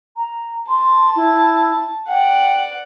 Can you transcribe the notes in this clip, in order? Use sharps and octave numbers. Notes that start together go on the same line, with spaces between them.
A#5
A5 C6
E4
D5 F#5 G5